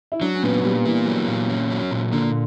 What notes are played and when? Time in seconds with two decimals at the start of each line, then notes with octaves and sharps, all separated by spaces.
0.12 E4
0.21 F#3 D4
0.34 C#4
0.43 A#2 B3
0.64 A#2 G3
0.84 E3 A#3
1.06 F#3
1.28 A#2
1.49 C#4
1.70 F#3
1.91 A#2
2.12 D3 A#3